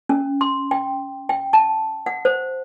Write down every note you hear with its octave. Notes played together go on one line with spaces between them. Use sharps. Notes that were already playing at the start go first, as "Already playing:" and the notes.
C#4
C6
G5
G5
A5
F#5
C5